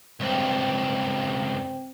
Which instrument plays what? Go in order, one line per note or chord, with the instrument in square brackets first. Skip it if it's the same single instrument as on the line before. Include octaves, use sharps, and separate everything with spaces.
[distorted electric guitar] C#2 G2 [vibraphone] C4 C5 G5